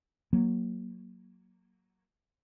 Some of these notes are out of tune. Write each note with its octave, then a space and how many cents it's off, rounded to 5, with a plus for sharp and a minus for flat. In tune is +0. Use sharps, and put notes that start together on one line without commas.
F#3 +0 A#3 +0